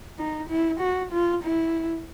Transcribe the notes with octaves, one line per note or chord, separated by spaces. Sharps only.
D#4
E4
F#4
F4
E4